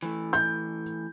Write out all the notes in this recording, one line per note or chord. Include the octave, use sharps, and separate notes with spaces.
E3 A3
G6